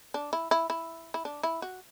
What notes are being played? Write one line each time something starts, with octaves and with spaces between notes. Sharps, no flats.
D4
E4
E4
E4
E4
D4
E4
F#4